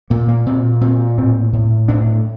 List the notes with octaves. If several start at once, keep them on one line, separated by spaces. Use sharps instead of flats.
A#2 A#3
A#3
A#2 C4
A#2 C4
A2 C4
A2
A2 D4